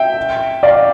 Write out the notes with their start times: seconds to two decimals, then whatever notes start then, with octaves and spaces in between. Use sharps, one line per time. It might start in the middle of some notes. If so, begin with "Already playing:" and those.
Already playing: E5 G5
0.63 D5 F5